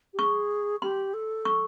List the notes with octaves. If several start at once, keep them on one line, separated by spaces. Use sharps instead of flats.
G4
G#4 C#6
G4 C6
A4
C#6